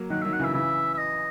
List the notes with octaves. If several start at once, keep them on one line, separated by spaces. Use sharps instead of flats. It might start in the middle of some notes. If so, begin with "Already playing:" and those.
Already playing: F#3 A#3
D#3 F#3 F#5
D#3 F#3 E5
F#5
C#3 E3 E5
C#3 E3 E5
E5
D#5